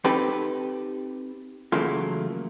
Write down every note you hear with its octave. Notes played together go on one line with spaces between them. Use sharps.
C4 D#4 G4 A4 B4 B5
C#3 E3 F#3 A3 A#3 F4